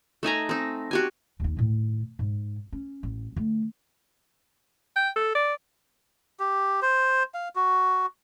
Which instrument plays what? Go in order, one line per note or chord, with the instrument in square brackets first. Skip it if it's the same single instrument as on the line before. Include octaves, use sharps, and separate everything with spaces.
[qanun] A3 D#4 G#5 A#5
C4 D#4
F#4 G4 G#5
[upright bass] D#2 D#4
A2 D#3
G#2
C#4
A1
D3 A3
[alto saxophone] G5
A4
D5
[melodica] G4
C5
F5
F#4